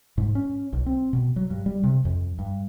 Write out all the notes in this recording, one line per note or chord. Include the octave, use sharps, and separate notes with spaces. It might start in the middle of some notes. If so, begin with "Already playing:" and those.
G#2
C#4
B1
C4
B2
F#3
G2
G3
C3
F2
G2